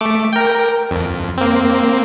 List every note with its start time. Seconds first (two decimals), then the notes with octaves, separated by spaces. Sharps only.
0.01 A3 D6
0.33 A#4 G5
0.91 F2
1.38 A#3 C4